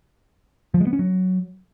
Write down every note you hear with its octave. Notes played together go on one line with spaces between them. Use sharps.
F3
G#3
B3
C#4
F#3